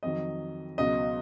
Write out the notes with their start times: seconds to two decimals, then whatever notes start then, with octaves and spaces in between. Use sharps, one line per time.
0.03 F2 D#3 F#3 D#5
0.78 C#2 B2 F#3 D#5